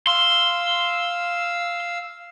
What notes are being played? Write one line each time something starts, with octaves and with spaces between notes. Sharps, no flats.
F5 C6 E6